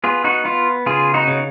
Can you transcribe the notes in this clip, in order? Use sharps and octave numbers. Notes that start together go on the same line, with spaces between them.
B3 F4 G#4
D#4 F#4
B3 F4
C#3 F4 G#4
D#4 F#4
C#3